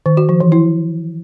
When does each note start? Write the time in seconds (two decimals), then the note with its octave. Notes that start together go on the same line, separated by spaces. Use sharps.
0.06 D#3
0.17 F#4
0.29 F3
0.40 E3
0.52 E4